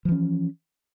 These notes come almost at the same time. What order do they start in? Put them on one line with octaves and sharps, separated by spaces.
F3 E3 C#4